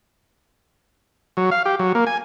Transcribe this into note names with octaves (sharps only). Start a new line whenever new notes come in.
F#3
F5
G4
F#3
A#3
G#5